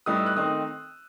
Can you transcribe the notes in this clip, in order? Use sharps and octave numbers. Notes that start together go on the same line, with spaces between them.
A2 G3 B3 D#4 D#6
E6
F#6
D#3 A3 C4 D#4 D#6